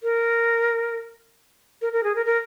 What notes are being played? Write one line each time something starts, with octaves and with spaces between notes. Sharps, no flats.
A#4
A#4
A#4
G#4
A#4
A#4